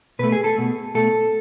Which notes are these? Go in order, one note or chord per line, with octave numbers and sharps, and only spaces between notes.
B2 A3 B4
G#4
A4
B2 A3
B2 A3 A4